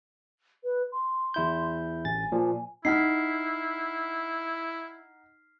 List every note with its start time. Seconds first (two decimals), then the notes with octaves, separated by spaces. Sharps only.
0.64 B4
0.92 C6
1.34 E2 E4 G6
2.05 A1 G#5 A6
2.32 A#2 F3
2.85 D#4 E4 F#5 F6 B6 C7